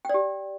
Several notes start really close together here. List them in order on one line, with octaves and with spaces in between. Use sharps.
G5 D5 G4